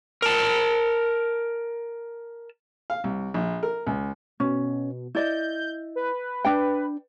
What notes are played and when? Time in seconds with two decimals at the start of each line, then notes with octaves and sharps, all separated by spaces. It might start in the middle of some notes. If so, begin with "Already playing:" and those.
0.22 A#4 A5
2.90 F5
3.04 C2
3.34 A#1
3.63 A#4
3.86 C#2
4.40 B2 C#4
5.15 E4 D5 D#5 G6
5.96 B4
6.45 D4 G5